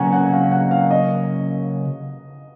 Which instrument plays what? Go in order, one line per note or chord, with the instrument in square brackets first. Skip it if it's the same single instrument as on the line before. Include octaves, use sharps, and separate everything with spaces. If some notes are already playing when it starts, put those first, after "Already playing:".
Already playing: [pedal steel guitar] C#3 F#3 A#3 C#4 F#4 [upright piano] F#5 G#5 A#5
[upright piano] F#5
F5
F#5
F5
D#5